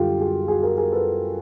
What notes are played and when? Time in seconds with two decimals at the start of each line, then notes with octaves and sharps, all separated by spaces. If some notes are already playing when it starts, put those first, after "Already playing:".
Already playing: F#2 D3 G3 F4 G4 A4
0.20 F#4 G#4
0.48 F#4 G#4
0.63 G#4 A#4
0.77 G#4 A#4
0.92 A4 B4